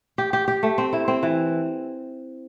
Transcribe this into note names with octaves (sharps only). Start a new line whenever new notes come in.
G4
G4
G4
A3
C4
E4
C4
E3